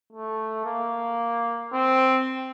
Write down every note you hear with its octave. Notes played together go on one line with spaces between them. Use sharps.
A3
A#3
C4